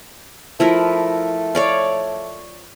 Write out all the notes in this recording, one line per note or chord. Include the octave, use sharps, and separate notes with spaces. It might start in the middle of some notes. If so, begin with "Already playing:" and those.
F3 A3 E4 A#4
C#5 D5 F5